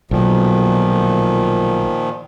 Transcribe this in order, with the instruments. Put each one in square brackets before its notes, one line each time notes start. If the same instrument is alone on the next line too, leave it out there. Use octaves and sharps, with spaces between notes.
[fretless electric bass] B1 [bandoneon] A#2 D#3 F3